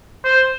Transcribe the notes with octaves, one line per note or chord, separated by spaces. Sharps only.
C5